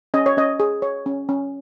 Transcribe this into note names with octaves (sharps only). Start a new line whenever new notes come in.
C#4 D#5
C#5
C#4 D#5
G#4
C#5
C#4
C#4